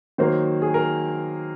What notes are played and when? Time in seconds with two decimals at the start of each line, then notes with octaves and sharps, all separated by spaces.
0.18 D#3 F#3 A#3 C5
0.62 G#4
0.74 A#4